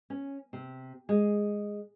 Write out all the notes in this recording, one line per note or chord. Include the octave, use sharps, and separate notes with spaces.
C#4
C3
G#3